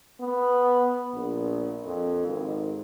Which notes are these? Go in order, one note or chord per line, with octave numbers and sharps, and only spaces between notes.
B3
A#1
F2
G#1